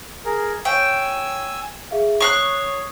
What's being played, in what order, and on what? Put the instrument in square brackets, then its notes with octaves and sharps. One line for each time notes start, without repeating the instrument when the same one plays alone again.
[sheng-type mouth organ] G#4 A#4
[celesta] C#5 F5 C#6 [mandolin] G5 [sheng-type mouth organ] G#5 E6
[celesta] G#4 E5 F5
[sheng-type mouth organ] C#5 [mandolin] C#6 F6 F#6 [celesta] D#6 C7